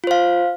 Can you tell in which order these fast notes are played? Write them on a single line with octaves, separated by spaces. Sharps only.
F4 C5 F5